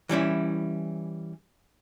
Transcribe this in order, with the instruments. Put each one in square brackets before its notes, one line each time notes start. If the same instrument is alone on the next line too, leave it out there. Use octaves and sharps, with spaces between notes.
[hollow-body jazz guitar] E3 G3 C#4 E4